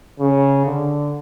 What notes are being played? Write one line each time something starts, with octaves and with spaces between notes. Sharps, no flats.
C#3
D3